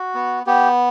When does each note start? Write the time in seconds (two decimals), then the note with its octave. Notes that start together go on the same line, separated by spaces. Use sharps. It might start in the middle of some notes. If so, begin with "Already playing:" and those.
Already playing: F#4
0.15 B3
0.46 B3 G4